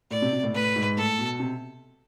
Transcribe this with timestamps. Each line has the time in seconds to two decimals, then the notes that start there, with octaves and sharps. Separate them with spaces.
0.11 A2 D5
0.22 C3
0.33 C3
0.43 A2
0.53 A2 B4
0.76 G#2
0.97 A2 A4
1.19 B2
1.40 C3